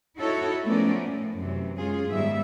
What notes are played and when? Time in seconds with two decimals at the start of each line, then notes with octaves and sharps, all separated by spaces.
0.17 D#4 E4 F#4 A4 C#5
0.65 F3 A3 B3 C#4 A#4 D5
1.05 A2
1.39 F#2 C3 E3
1.76 G#3 C#4 F4 G#4
2.07 G#2 D#3 G3 B3 E5